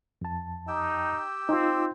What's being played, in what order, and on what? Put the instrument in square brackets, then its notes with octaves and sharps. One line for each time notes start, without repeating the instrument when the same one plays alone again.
[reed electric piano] F2 A5
[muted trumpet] D#4 [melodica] G4 G5 E6
[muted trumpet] C4 [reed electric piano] D#4 F4